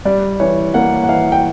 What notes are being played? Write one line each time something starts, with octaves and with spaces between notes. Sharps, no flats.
G3 D5
E3 C#5
A#3 F#5
F#5
E3 F5
G5